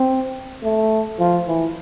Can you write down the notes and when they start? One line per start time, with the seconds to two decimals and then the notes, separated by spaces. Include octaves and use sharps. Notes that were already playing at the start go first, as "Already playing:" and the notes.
Already playing: C4
0.64 A3
1.20 F3
1.48 E3